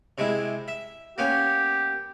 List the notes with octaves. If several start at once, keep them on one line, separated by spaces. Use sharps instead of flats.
C3 G#3 E4
E5
A#3 B3 C#4 G4